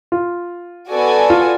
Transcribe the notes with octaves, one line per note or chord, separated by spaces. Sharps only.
F4
B3 F#4 A4 D5 G#5
F4